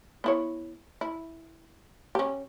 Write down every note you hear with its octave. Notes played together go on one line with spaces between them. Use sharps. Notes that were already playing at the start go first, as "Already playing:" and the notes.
B3 E4 C#5
E4
C#4 G4